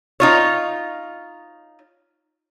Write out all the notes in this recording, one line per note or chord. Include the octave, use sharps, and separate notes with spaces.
D#4 F4 C#5